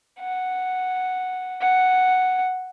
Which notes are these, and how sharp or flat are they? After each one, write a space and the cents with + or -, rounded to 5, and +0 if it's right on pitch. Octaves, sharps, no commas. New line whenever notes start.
F#5 +0
F#5 +0